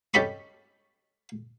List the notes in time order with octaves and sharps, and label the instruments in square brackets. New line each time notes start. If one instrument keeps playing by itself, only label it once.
[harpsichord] C#4 G4 A4 D#5 B5 C#6